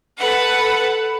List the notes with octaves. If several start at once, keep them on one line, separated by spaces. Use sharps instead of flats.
A4 B4 F#5